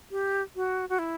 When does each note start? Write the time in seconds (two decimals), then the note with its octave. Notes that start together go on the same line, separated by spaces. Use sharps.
0.11 G4
0.56 F#4
0.89 F#4
0.99 E4